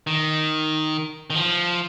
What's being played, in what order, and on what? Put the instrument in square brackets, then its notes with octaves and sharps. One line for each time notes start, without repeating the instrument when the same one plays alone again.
[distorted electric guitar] D#3
D#3
F3